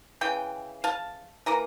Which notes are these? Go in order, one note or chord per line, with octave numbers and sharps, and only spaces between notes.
C#3 E3 G5
F5 A5
E3 A#3 A#5